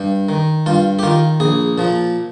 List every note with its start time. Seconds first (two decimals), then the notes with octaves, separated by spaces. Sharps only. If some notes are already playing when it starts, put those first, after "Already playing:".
Already playing: G2
0.29 D#3
0.66 G2 F4
0.99 G4
1.03 D#3 F4
1.40 A#1 G#4
1.78 A#2 F3